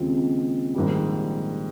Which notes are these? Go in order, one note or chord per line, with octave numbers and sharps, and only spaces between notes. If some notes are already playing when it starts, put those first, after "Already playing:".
Already playing: D#2 C#3 G#3 C4 F4
A#1 G#2 D#3 G3